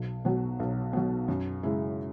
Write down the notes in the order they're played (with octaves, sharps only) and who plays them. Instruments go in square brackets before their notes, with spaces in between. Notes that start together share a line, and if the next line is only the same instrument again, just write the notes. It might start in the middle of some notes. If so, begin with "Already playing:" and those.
Already playing: [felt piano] B1
B2 F#3
B1
B2 F#3
F#2
C#3 G#3 E4